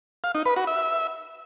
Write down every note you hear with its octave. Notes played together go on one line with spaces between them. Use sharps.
F5
D#4
B4
F#4
E5